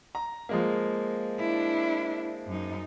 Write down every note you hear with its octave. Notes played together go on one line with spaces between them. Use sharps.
A#5
F3 G#3 A#3
D4 E4
F#2 D#4